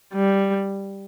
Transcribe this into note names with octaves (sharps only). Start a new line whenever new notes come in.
G3